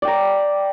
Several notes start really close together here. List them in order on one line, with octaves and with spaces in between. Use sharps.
D5 G5 A#5